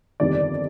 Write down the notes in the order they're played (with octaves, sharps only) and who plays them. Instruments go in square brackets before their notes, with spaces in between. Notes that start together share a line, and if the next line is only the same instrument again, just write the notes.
[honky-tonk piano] G1 F2 C3 D#3 G3 D5